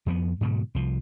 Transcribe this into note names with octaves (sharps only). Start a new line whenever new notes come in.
F2 F3 A#3 B3
G#2 B2 D3 F#3
C2 F3